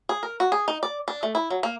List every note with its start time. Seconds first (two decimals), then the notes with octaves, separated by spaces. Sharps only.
0.09 G#4
0.23 A#4
0.40 F#4
0.52 G#4
0.68 D#4
0.83 D5
1.08 D4
1.23 A3
1.35 E4
1.51 F#3
1.63 A#3